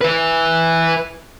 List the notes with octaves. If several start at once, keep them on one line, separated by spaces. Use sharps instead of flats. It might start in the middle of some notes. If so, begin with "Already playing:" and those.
E4 B4